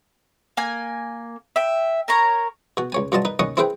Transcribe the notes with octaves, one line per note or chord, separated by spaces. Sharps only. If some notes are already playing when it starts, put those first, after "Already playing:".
A#3 G#5
E5 G5
A#4 C#5 A#5
B2 F#4
C#2 C#5 G#5
G2 F#3 F4 D#5 A5
D#4 B4
D#2 C#4 D#5 F#5 C#6 D#6
C4 E4 G#4 B4 C5 G5